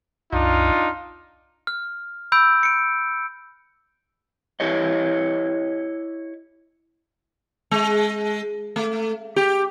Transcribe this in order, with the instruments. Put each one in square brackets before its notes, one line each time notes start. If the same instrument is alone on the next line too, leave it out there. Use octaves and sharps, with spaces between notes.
[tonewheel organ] C2 F#2 [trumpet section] D4 D#4 F4
[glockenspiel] F6
B5 E6 G6 D7
C#7 D7
[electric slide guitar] E4 G4 C#5 D#5
[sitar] G#3
A3
G4